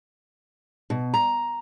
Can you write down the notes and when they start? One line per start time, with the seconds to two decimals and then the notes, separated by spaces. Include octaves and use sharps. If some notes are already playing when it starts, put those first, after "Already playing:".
0.90 B2
1.14 A#5